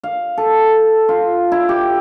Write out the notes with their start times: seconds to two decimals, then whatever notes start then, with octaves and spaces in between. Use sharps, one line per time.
0.03 F5
0.37 A4
1.09 F4
1.52 E4
1.69 G4